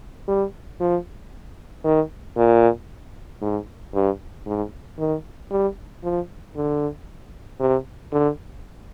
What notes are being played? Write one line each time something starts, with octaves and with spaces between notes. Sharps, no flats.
G3
F3
D#3
A#2
G#2
G2
G#2
D#3
G3
F3
D3
C3
D3